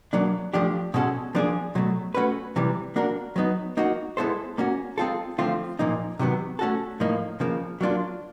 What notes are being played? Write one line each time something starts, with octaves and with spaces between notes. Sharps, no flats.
B2 F#3 A#3 D4
F3 A3 D4 G4
B2 G#3 C#4 F#4 A4
F3 A#3 D4 F4 G#4
B2 F#3 A3
A3 C#4 F#4 B4
C3 E3 G3
A#3 D4 F#4 A#4
F#3 B3 D#4
A#3 D#4 F#4
G#3 B3 E4 A4 C5
A#3 C#4 F#4
G#3 C4 F4 A4
D3 F3 A3 C4 F4
A#2 F3 A#3 D#4
C3 D#3 F#3 B3
A3 C#4 F#4 A4
A2 F3 A#3 D#4
C#3 F3 A#3
F#3 A#3 D4 F4